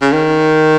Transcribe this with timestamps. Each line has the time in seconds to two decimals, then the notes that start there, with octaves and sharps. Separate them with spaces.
0.01 C#3
0.12 D#3